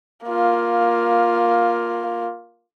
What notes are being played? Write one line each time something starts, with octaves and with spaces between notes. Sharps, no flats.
A#3 F4